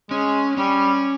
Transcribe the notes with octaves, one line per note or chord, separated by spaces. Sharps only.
G#3 C#4
G3 C#4